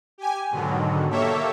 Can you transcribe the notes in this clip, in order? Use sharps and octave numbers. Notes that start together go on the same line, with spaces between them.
G4 G#5
G#2 B2 D3 D#3 F#3
A#3 G4 A4 C#5 E5